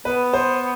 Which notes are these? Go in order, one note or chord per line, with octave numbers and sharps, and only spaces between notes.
B3 B4
C5